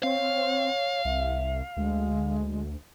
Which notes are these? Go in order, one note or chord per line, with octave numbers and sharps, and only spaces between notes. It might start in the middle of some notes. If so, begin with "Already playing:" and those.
C4 C#5 F5
C2 E5
D2 G#3